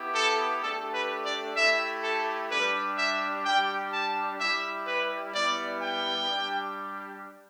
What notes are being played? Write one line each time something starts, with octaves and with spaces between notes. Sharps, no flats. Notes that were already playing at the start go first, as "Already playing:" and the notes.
Already playing: B3 E4 G4
A4
A3 D4 G4 A4
B4
D5
A3 E4 G4 E5
A4
G3 D4 G4 B4
E5
G3 D4 G4 G5
A5
G3 E4 G4 E5
B4
G3 B3 E4 G4 D5
G5
G3 D4 G4